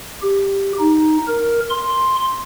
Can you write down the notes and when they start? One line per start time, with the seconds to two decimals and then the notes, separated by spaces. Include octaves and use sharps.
0.23 G4
0.79 D#4
1.28 A#4
1.70 C6